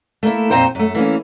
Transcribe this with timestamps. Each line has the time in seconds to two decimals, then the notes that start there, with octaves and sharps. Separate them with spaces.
0.23 A3 A#3 E4
0.50 F2 A#2 C4 D#4 C5 G5
0.75 F#2 A3
0.95 E3 A#3 C#4